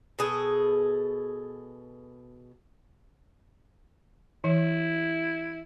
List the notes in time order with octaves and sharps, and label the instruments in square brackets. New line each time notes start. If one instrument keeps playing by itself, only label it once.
[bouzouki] B2 G#4 A4
[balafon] E3 [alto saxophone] E4